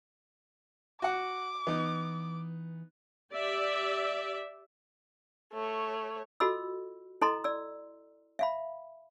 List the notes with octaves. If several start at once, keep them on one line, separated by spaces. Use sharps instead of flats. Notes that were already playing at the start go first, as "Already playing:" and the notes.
F#4 F#5 D6
E3 B3 D#4
G4 D5 E5
A3 C#5
F4 F#4 A4 D#5 B5 E6
E4 A4 D#5 A#5 C6
D5 E6
E5 F5 B5